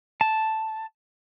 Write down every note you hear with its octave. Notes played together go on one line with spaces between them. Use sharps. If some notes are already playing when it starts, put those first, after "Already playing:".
A5